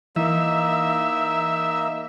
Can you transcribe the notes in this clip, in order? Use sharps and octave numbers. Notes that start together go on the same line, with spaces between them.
E3 A#3 D#4 E5